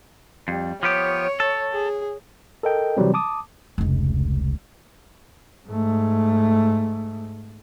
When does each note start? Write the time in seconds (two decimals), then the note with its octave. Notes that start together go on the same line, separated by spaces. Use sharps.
0.48 F2 G3
0.83 F3 B3 G4 C#5
1.40 A4
1.73 G#4
2.63 A4 A#4 D#5 G5
2.97 C3 E3 F#3 G3 C4
3.14 A5 D6 D#6
3.78 F1 C#2
5.67 G#2 A3